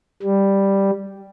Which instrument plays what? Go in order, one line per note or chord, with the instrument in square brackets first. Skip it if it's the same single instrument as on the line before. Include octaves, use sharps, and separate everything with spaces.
[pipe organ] G3